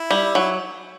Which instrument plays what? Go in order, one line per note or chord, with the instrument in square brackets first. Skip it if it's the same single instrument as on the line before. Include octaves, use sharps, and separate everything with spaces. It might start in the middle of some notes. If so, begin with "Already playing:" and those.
Already playing: [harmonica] E4
[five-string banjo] G3
F#3